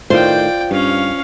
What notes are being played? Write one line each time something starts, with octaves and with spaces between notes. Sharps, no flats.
A2 D#3 F4 C5 D5 G5
G2 C#4 F5